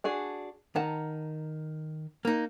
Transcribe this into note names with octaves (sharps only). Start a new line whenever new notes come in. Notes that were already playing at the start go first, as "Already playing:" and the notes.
D4 F#4 G#4
D#3 F#5 A5 A#5
A#3 D#4